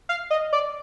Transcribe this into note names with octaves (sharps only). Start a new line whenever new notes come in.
F5
D#5
D5